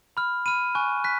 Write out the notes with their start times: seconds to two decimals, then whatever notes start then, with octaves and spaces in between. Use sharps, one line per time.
0.17 B5 F6
0.46 B5 F6 D#7
0.75 G#5 C#6 F#6
1.04 F#6 B6